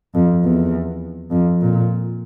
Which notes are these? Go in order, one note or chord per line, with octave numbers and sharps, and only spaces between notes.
F2
E2
F2
A#2